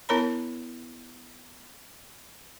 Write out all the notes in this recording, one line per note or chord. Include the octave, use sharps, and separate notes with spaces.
B3 E4 A#4 C#5 A#5 B5